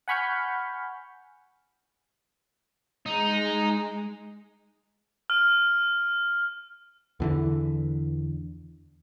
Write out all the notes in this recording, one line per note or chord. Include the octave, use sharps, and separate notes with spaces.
F#5 G#5 B5 C#6 F6 G6
G#3 D#4
F6
E2 D3 E3